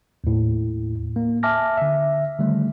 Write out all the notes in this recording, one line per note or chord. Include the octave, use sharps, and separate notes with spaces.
D#2 A2
A#3
E5 G#5 A5 D6 F6 A#6
D3 E5
D3 D#3 G3 A3